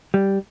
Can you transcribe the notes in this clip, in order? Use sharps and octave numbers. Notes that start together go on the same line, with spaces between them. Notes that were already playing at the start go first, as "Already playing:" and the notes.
G3